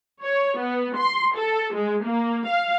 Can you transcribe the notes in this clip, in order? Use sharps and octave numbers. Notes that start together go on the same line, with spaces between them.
C#5
B3
C6
A4
G#3
A#3
F5